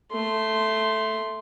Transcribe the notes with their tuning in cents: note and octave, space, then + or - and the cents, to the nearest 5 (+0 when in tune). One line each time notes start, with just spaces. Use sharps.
A3 +0 C6 +0